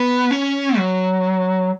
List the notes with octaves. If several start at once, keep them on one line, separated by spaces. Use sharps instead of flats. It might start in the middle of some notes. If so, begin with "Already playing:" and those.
Already playing: B3
C#4
F#3